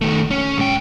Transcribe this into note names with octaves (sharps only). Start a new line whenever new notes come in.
D#3 A3
C#4
G#2 G5